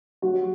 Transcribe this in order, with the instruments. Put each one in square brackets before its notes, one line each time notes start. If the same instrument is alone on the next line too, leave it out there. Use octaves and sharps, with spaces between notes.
[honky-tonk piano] F#3 F#4